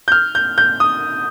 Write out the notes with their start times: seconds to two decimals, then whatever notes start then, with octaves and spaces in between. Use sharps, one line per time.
0.08 G6
0.12 F6
0.35 G6
0.58 G6
0.80 D#6